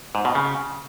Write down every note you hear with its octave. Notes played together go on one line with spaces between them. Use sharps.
G#2
B2
C#3